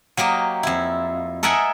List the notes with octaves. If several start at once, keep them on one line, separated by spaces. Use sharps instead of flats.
F#3 A#3 G4 D#5
F2 E4
A4 A#4 D#5 E5 F#5 G#5